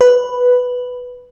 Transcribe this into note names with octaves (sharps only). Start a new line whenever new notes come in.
B4